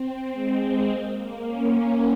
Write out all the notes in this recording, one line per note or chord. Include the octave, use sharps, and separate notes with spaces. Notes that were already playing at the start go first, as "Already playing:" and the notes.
Already playing: C4
G#3
A#3
A#3
C#4
A#3